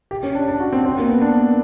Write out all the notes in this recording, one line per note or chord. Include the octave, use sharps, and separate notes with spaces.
G4
C#4
D4
D4
F#4
C4
C4
A#3
B3
D4